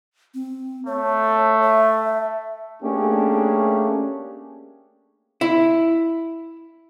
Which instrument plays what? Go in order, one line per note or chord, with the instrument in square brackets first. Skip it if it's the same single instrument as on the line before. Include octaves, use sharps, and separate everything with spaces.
[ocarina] C4
[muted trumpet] A3 [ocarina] C#5
[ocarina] E5
[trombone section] A3 A#3 C#4 D4 G4 G#4
[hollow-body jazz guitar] E4